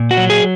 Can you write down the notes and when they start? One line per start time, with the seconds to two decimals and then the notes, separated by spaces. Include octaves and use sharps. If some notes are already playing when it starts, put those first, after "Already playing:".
Already playing: A#2
0.11 F#4
0.17 F#3
0.30 G#4